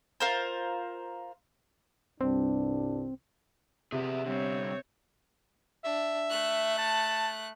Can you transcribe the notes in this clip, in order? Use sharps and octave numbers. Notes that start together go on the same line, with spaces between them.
F4 A#4 C5
C2 G2 C4 D4
C3 G#4 B4 E5
D3 G3 C4 C#5
D4 E5
A3 F#6
A5